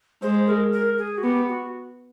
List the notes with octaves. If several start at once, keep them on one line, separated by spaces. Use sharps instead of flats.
G#3 C5
A#4
A#4
G#4
F#4
B3 G4
F#4